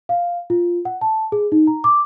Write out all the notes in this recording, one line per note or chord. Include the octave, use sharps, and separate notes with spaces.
F5
F4
F#5
A5
G#4
D#4
A#5
D6